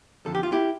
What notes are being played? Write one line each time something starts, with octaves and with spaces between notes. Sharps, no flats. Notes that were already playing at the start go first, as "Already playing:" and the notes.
F2 D3 F3 A4
G4
F4
E4 G4